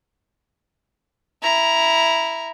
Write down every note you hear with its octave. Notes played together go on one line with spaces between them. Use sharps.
E4 A#5